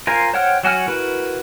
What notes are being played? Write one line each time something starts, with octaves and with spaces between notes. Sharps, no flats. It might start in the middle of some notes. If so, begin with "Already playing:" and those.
F4 A#4 C5 F5 G#5
C5 C#5 F#5 G5 F6
F#3 F#4 G#5 F6
E4 F#4 A#4 B4